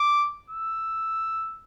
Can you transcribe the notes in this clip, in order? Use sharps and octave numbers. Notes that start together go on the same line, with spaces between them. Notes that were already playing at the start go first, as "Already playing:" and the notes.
Already playing: D6
E6